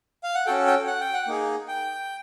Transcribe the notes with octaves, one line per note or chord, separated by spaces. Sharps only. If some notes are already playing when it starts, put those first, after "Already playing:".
F5
F#5
C#4 F#4 A4 G5
G5
F#5
G5
F#5
A#3 D#4 G#4
G5